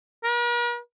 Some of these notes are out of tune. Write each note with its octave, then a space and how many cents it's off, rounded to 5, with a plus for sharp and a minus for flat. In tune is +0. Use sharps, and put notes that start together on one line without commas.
A#4 +45